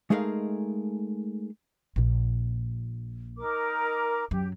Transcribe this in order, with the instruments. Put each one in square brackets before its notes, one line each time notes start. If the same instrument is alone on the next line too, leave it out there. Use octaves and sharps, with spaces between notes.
[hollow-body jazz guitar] G#3 A3 D#4 G#4 A#4 F5
[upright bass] A#1 A#2
[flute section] D#4 A#4 D6
[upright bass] F#2 F#3 [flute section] G4